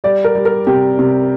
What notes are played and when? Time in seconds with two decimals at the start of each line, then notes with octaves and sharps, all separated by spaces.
0.04 G3 D5
0.24 A#4
0.35 G3
0.45 A#4
0.67 C3 G4
0.99 C3